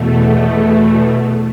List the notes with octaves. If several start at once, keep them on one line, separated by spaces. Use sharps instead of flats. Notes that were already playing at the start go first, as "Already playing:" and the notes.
Already playing: E2 B2 A3